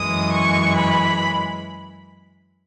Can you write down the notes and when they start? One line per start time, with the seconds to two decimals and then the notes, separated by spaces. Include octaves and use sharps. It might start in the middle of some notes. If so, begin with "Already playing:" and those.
Already playing: F#2 E3 G#3 D#6
0.33 C#6
0.76 B5